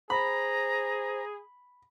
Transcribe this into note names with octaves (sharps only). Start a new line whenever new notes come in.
G#4 C5 A#5 B5